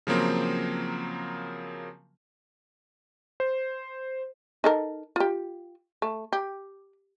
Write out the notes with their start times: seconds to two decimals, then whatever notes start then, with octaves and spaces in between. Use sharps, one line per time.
0.07 C#3 F3 F#3 A#3 C4
3.40 C5
4.64 D#4 A4 A#4
5.16 F4 G4
6.02 A3
6.33 G4